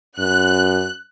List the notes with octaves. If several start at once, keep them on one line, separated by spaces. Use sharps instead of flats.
F#2 F#6